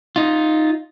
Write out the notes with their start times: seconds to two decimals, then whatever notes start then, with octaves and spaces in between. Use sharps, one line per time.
0.16 D#4 F4